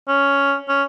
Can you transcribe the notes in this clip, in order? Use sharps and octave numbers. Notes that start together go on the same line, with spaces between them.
C#4
C#4